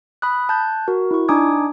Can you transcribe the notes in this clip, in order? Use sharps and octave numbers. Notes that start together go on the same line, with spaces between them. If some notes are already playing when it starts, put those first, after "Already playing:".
B5 D#6 F#6
A5 F#6 G6
F#4 A#4
E4 C#6
D4 D#4 G#5 D6 D#6 G#6